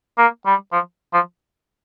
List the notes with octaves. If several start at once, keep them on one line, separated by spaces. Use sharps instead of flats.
A#3
G3
F3
F3